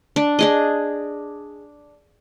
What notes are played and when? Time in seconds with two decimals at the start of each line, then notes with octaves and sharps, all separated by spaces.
0.16 D4
0.39 D4 G#4 D#5